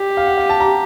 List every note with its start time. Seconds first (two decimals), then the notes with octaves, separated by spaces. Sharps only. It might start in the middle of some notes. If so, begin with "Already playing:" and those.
Already playing: G4
0.17 F5
0.27 F#5
0.38 F5
0.49 A5
0.60 A#5